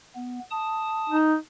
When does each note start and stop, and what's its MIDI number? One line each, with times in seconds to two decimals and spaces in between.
0.16 0.40 59
0.51 1.16 81
0.51 1.16 87
1.10 1.36 63